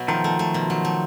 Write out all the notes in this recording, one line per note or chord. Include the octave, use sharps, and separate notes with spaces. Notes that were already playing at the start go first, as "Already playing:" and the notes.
Already playing: B2 F#3
D#3 F3 A3
A3
A3
B2
F#3
A3